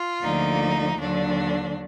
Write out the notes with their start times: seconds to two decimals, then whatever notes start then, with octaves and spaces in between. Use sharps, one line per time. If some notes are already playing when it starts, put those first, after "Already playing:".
Already playing: F4
0.22 D2 D3 F3 A#3 D#4
0.99 D#2 D3 F#3 D4